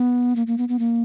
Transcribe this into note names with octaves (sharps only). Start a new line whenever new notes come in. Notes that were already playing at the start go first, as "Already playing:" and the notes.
Already playing: B3
A#3
A#3
B3
B3
A#3